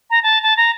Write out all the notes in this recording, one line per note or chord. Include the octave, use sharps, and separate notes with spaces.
A#5
A5
A5
A#5